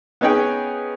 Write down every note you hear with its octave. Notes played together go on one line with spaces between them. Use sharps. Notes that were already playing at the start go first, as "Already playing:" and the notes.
B3 C#4 D#4 G#4 G5